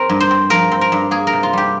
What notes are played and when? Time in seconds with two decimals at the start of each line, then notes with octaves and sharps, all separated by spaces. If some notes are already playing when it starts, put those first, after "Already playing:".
Already playing: C4 A#4
0.09 G2
0.20 C5
0.31 C4
0.50 F3 A#4
0.72 C4
0.81 A#4
0.92 G2
1.11 A#3 G#4
1.27 A#4
1.33 C3
1.43 F4
1.53 G3 G4